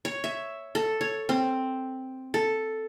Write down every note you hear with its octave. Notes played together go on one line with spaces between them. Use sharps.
C#5
E5
A4
C#5
C4
A4